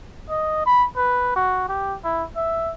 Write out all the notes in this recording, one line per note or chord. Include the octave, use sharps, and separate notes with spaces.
D#5
B5
B4
F#4
G4
E4
E5